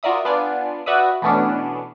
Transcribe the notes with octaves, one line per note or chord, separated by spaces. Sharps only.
F4 F#4 A#4 D5 E5 D#6
B3 D4 F4 D5 G#5
F#4 B4 D5 E5 D#6
B2 E3 A3 B3 C#4 D4